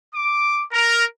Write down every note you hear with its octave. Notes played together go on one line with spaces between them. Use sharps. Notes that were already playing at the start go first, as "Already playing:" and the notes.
D6
A#4